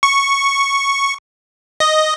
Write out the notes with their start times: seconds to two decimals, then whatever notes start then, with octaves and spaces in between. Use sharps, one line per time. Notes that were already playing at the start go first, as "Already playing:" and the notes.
0.03 C#6
1.80 D#5